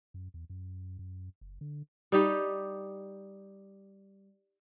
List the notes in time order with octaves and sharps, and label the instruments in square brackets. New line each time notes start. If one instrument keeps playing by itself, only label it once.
[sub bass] F#2
E2
F#2
F#2
F#1
D3
[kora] G3 D#4 G4